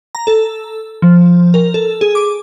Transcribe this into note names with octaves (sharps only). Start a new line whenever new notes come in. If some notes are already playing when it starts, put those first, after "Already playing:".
A#5
A4
F3
A#4
A4
G#4
D6